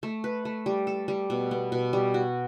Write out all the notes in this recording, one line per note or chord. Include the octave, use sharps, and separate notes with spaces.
A3
B4
A3
G3
A4
G3
B2
B3
B2
G3
F#4